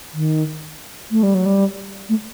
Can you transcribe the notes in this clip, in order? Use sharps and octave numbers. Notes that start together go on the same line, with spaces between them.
D#3
A3
G3
F#3
G3
A3